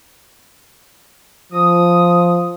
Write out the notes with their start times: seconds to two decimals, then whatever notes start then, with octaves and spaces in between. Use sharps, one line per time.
1.52 F3 D#6